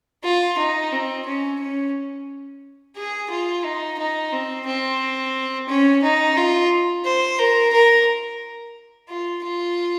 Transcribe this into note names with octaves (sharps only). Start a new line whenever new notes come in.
F4
D#4
C4
C#4
C#4
G#4
F4
D#4
D#4
C4
C4
C#4
D#4
F4
C5
A#4
A#4
F4
F4